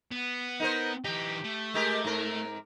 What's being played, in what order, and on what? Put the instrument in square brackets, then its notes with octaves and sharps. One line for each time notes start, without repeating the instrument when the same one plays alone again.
[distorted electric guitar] B3
[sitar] D#4 A#4 C5
[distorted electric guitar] E3 D#4 [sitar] G4
[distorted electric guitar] A3
[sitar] G#3 G4 A#4
G#2 C4 A#4